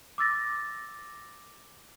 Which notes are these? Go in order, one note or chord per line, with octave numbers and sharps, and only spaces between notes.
D6 E6 A6 A#6